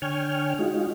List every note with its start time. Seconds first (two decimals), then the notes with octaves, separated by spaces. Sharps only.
0.02 D3 C#5 G5 G#5 F6
0.59 G#3 D#4 F4 F#4